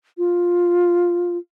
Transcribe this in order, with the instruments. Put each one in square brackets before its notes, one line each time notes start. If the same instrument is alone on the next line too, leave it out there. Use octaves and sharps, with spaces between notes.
[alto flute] F4